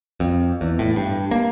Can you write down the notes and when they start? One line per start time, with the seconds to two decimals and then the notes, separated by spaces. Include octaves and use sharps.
0.20 F2
0.61 E2
0.79 A2
0.96 G2
1.31 A#3